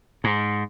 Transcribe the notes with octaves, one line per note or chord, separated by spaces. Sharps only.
G#2